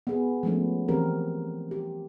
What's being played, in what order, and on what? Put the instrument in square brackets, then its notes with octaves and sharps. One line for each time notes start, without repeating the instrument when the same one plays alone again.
[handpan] B3 G#4
F3 G#3 A3 B3 C#4
E3 C4 G4 A#4
G4